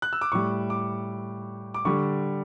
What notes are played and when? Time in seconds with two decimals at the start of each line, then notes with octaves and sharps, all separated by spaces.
0.02 F#6
0.13 E6
0.21 D6
0.32 A2 G3 C#6
0.70 D6
1.74 D6
1.85 D3 G3 C#6